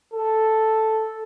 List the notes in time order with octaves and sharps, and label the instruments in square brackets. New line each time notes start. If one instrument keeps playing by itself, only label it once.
[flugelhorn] A4